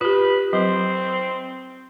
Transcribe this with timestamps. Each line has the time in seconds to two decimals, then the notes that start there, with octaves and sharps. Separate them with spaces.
0.01 F4 G4 B4
0.53 F#3 C4